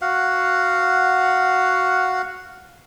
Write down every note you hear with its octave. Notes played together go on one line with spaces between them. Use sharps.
F#4 F5 F#5